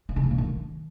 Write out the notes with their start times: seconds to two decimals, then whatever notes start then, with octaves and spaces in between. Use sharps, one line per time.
0.09 D#3
0.16 C#3
0.24 A#3
0.31 A#2
0.38 D#3